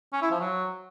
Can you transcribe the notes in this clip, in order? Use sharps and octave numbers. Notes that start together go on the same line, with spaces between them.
C#4
E4
F3
F#3